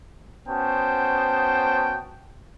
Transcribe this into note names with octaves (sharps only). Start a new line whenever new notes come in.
B3 C#4 F#4 C5 G5 A5